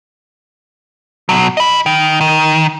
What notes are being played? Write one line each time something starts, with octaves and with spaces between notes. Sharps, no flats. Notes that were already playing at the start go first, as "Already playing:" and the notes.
B2 F#3
D#5 B5
D#3
D#3